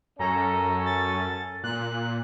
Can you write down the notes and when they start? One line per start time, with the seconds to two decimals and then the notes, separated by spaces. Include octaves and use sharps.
0.19 F#2 C#4 A4 A#5
0.86 A6
1.64 A#2 F#6